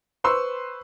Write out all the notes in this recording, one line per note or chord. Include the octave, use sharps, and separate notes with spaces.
B4 C5 C6 C#6 E6